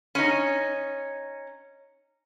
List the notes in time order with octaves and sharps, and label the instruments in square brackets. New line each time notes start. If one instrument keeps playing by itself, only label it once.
[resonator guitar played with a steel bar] C#4 D#4